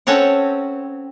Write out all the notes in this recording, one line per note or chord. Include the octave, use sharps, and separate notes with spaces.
C4 C#4 A4 C#5 F#5